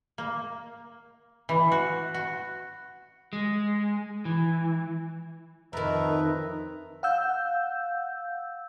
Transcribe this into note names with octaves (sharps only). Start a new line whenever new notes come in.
A#3
E3
F#4
F#4
G#3
E3
F2 D#3 B4 E5 A#5
F5 F#5 E6 G6